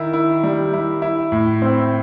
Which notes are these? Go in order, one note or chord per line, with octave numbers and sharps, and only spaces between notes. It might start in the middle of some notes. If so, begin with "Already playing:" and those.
Already playing: D#3 E4
E4
G3
E4
E4
A2
C4